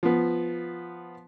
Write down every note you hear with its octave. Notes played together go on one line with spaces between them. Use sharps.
F3 B3